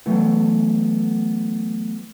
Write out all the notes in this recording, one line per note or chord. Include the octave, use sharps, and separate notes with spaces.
E3 F#3 A3 B3 E4